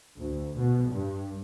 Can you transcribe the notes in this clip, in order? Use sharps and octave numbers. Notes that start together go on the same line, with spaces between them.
D2
B2
G2